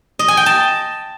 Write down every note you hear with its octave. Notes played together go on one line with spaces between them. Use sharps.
D#5
G#5
G5
A5